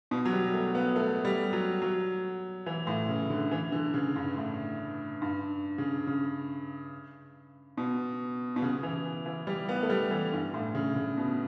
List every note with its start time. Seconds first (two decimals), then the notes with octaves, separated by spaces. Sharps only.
0.11 B2
0.25 F#3
0.33 G3
0.54 A3
0.75 B3
0.96 A3
1.25 G3
1.53 F#3
1.82 F#3
2.66 E3
2.87 A2
3.09 C#3
3.30 D3
3.51 E3
3.72 D3
3.94 C#3
4.16 G2
4.37 A2
5.22 G2
5.78 C#3
6.07 C#3
7.77 B2
8.56 B2
8.62 C#3
8.83 E3
9.26 E3
9.47 G3
9.69 B3
9.83 A3
9.90 G3
10.11 E3
10.32 G2
10.54 A2
10.75 C#3
10.96 C#3
11.18 B2